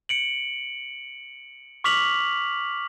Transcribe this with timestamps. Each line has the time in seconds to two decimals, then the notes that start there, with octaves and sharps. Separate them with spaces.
0.09 C#7 D7 F#7
1.84 C#6 D6 F6 B6 F7 F#7